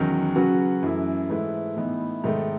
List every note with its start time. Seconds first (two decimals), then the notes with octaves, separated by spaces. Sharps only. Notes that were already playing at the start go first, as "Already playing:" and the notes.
Already playing: E2 D#3 F#3 C#4
0.36 C#3 F#3 C#4 F#4 B4
0.83 F#2 E3 A3 E4
1.29 G#2 E3 A3 E4 B4
1.76 A2 E3 B3 D#4
2.24 G#2 D#3 A3